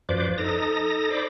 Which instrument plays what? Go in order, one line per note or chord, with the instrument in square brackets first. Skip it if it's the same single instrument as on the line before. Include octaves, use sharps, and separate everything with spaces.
[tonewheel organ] F#2 F3 B4 C5 D5 D6
D#4 A4 A#5 D#6 A#6
C5 D5 B5 D6